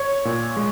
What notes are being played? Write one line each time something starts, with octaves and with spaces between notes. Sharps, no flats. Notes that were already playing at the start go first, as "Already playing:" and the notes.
Already playing: C#5
A#2
G#3